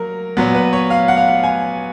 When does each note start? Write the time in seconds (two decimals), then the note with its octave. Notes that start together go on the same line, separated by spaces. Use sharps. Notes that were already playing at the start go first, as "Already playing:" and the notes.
Already playing: F#3 A#3 A#4
0.37 A#2 F#3 B3
0.55 B4
0.73 C#5
0.90 F5
1.08 F#5
1.18 F5
1.28 F#5
1.43 G#5